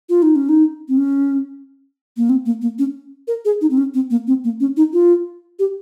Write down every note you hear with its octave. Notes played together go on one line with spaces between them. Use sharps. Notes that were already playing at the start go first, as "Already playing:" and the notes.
F4
D#4
C#4
D#4
C4
C#4
A#3
C4
A#3
A#3
C#4
A#4
G#4
D#4
C4
C#4
C4
A#3
C4
A#3
C#4
D#4
F4
G4